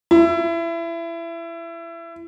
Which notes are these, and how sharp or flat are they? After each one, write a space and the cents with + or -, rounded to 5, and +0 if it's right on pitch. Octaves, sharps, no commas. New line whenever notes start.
E4 +25